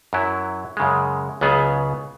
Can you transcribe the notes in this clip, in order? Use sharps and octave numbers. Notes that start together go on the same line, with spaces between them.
F#2 F#3 E4
F#2 C#3 G#3
C#2 C#3 F#3 B3 G#4